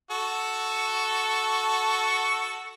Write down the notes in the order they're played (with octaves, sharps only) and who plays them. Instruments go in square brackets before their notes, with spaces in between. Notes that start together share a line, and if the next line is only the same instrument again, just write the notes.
[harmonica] F#4 A4 C#6